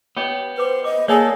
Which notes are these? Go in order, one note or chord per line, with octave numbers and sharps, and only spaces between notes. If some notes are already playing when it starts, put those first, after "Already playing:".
B3 G4 C#5 D#5
B4 C5 D6
D#5 D6
A#3 G#4 A4 C#5 D5 G#5